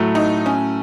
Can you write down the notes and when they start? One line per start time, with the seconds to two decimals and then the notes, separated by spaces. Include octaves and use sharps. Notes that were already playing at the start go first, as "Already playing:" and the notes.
Already playing: A2 F#3 A3
0.15 D#4
0.46 C#4